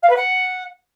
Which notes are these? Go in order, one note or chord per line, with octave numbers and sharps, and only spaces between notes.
F5
B4
F#5